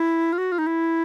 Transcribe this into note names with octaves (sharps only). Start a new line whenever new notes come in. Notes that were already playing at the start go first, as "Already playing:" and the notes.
Already playing: E4
F4
F#4
F4
D#4
E4